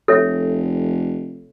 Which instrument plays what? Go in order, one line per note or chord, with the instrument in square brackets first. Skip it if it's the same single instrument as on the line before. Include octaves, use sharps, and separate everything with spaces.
[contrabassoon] F1 [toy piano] A4 C#5 E5